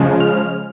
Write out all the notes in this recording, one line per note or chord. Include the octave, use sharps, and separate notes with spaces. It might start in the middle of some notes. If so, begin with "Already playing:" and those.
Already playing: C#3 F3 G#3
F6